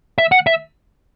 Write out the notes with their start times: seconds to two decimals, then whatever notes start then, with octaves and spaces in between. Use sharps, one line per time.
0.18 E5
0.32 F#5
0.47 E5